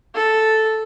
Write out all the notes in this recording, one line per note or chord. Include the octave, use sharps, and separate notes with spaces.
A4